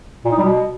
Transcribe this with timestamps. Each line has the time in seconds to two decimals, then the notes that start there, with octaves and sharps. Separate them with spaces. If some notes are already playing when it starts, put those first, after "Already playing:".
0.25 A#2
0.31 D#4
0.38 G3
0.44 B2